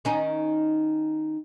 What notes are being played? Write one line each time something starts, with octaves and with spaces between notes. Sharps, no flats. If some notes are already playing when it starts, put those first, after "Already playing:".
D#3 C#4 D#4